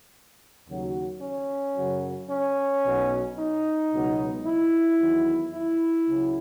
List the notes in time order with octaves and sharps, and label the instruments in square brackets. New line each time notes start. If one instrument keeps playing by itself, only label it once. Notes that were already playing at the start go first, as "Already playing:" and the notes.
[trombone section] D#2 C#3 F#3
C#4
F#2 C#3 F#3
C#4
B1 B2 F#3
D#4
C#2 B2 F#3
E4
E2 D#3 F#3
E4
C#2 C#3 F#3